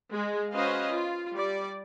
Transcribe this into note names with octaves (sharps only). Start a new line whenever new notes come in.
G#3
C#4 F#4 B4 C5 D#5 F5
F4
G3 D5